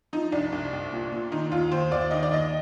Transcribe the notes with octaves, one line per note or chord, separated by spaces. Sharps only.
F3 D#4
C2 D4
C2
C2
A#2
A#2
D#3 D#4
D#2 F4
D#2 C5
D#2 D5
D#3 D#5
D5
D#2 D#5